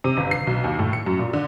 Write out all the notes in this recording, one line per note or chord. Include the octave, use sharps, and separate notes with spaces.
C3
G1
C7
B1
D#2
A2
C#7
F#2
A#2
D3